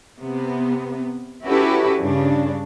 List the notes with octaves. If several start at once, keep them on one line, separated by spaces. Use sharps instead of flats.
C3 B3
C#4 E4 F#4 G4 A4 B4
G2 C#3 D4